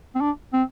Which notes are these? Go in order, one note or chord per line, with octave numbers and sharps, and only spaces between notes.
C4
D4
C4